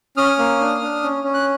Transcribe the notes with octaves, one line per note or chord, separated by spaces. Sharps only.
C#4 D#6 F6
A#3
D4
D4
C#4
C#4
F#6